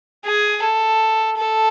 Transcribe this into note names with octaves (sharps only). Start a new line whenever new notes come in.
G#4
A4
A4